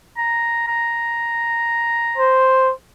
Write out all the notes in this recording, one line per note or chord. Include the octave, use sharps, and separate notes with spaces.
A#5
A#5
C5